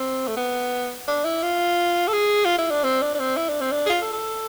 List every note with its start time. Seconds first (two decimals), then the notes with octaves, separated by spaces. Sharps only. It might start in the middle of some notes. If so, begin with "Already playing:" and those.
Already playing: C4
0.27 A3
0.37 B3
1.08 D4
1.25 E4
1.43 F4
2.08 A4
2.13 G#4
2.45 F4
2.59 E4
2.71 D4
2.84 C4
3.02 D4
3.15 D4
3.20 C4
3.37 E4
3.49 D4
3.61 C4
3.72 D4
3.86 G#4
3.89 F4
4.02 A4
4.13 A4